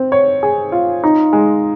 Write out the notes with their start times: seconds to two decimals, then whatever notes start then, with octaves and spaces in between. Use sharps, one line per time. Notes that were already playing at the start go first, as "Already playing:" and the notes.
Already playing: C4
0.12 C#5
0.43 G#4
0.72 F4
1.04 D#4
1.33 G#3